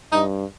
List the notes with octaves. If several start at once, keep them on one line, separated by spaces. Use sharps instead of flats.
G2 D#4